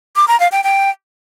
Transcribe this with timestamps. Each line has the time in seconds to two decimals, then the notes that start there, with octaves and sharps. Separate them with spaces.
0.16 D6
0.28 A#5
0.40 F5
0.52 G5
0.64 G5